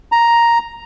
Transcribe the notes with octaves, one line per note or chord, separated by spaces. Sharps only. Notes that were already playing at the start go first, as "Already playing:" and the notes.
A#5